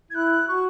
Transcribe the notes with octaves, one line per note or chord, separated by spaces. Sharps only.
E4 F#6 G#6
F#4 C#6